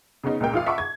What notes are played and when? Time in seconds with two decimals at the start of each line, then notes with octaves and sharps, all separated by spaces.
0.24 C#3 B3 C#4 D#4
0.40 C#2 A#2 A#4 G5
0.53 A1 F4 F5
0.66 E5 F#5 A5 B5 C#6 D6
0.78 G#6